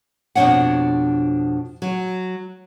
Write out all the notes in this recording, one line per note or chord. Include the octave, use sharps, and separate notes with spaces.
F2 B2 D3 D4 C#5 F#5
F#3